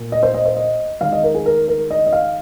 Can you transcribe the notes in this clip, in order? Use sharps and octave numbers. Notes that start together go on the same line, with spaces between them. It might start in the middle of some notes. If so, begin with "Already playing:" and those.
Already playing: A#2 A#3
D#5
C5
D#5
C5
D#5
D#3 G#3 F5
D#5
A#4
G#4
A#4
A#4
D#5
D#5
F5